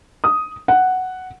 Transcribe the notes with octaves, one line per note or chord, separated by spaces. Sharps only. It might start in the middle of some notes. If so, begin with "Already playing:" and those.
D#6
F#5